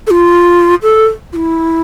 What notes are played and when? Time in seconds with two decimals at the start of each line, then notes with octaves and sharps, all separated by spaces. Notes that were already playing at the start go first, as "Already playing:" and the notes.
0.07 A4
0.11 F4
0.83 A4
1.33 F4
1.36 E4